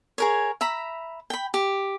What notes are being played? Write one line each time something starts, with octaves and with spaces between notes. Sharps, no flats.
G#4 A#4 C#5
E5 A#5 B5
G5 B5
G4